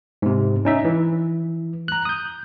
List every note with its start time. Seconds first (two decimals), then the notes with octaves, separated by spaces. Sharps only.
0.22 G#2 C3
0.65 C#4 D#4 E5
0.85 E3
1.88 A#5 F#6
2.05 D#6 G6